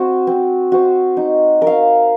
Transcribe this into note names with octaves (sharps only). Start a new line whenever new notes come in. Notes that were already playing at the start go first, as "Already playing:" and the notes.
Already playing: C4 F#4 C5
C4
F#4 C5
D#4
A#4
F5